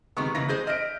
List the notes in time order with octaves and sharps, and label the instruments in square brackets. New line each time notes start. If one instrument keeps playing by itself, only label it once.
[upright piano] C3 C#6 [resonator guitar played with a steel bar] D#3 G#3 B3
[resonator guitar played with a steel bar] C#3 E3 A#3 [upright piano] A#6
[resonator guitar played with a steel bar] G#3 G#4 C5 [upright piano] G6
[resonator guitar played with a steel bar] D#5 E5 [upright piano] F6 D7